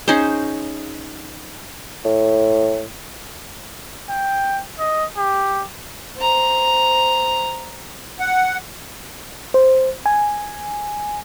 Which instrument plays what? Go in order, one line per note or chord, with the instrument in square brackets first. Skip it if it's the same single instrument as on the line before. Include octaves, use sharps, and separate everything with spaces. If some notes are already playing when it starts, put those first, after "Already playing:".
[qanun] C#4 D#4 G#4 C5
[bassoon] A2
[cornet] G5
D#5
G4
[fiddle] C5 A#5
[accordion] F#5
[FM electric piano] C5
G#5